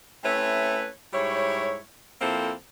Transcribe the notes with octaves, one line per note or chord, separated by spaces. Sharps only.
A3 C4 C#4 E4 B4 C#5
G#2 G3 E4 C#5
F2 A#3 C4 E4 A4 C5